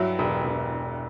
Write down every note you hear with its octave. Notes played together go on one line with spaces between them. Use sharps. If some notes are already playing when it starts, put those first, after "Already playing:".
Already playing: G2 F#3 E4
E1
E1